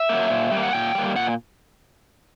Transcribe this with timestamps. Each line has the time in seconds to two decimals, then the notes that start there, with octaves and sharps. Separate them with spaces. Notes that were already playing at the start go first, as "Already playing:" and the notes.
Already playing: E5
0.09 F#3 A#3
0.30 A#2
0.51 G3
0.57 A#3
0.63 F#5
0.73 A#2 G5
0.95 G3 A#3
1.16 A#2 F#5